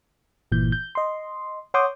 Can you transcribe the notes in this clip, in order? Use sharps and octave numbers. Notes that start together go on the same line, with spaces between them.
G1 A#2 E3 G6
G6
D#5 C6
C#5 F#5 C6 D6 D#6 G6